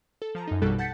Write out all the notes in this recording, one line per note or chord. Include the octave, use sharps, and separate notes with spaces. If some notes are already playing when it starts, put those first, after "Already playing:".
A4
F3 A5 A#5
F#2 D#4
A#1 B2 G3 A4 F#6
F#5 A5 G6 A6 B6 C#7